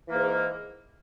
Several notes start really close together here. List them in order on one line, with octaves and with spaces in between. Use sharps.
E3 A#3 G#2